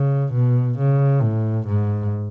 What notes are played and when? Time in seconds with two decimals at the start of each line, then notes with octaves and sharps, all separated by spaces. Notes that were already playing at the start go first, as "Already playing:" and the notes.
Already playing: C#3
0.33 B2
0.77 C#3
1.21 A2
1.66 G#2